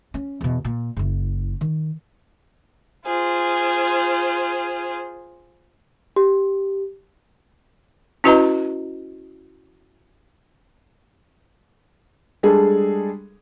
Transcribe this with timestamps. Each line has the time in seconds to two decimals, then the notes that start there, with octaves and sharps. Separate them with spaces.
0.14 C#4
0.41 E2 B2
0.65 A#2
0.97 F#1 E4
1.61 D#3
3.06 F4 G#4 C5
6.16 G4
8.24 C#4 E4 F#4 B4 D#5 A#5
12.43 G3 G#3 D4 G#4 A4